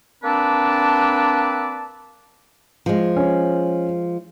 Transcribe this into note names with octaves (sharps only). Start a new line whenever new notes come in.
A#3 C4 D4 B4 D5 A5
F3 G#3
C#4